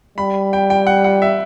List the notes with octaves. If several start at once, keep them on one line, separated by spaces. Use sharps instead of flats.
G3 B5
G5
G5
F#5
F#5
E5